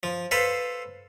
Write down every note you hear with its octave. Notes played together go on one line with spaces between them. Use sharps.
F3
A4 B4 C5 F5